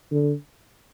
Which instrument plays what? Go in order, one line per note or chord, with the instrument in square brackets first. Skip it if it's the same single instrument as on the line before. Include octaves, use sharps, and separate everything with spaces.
[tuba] D3